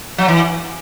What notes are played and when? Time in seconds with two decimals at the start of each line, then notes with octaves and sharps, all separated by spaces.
0.18 F#3
0.28 E3